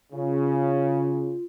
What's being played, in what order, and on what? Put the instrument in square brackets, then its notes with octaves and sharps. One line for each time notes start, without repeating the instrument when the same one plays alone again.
[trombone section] C#3 [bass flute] F4